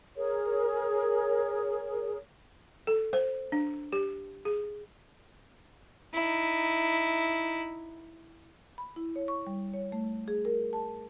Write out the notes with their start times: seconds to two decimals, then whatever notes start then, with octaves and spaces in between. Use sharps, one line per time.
0.16 G#4 A#4 C#5
2.87 A4
3.13 C5
3.52 D4
3.93 G4
4.45 G#4
6.14 D#4 E4
8.78 B5
8.96 E4
9.16 C#5
9.28 C#6
9.47 G3
9.74 C#5
9.92 A3
10.28 G#4
10.45 A#4
10.73 A5